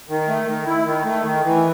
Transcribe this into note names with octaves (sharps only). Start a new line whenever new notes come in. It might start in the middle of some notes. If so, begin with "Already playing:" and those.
D#3
A3
D#3
E4
D#3
A3
D#3
E3